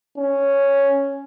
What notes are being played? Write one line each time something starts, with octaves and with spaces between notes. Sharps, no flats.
C#4